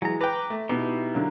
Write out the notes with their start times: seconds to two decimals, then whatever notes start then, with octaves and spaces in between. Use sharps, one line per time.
0.02 E3 F#3 G#3 A#5
0.21 B4 G5 A#5 D6
0.50 A3
0.69 B2 D#4 E4 G4
1.14 D3 F#3 A#3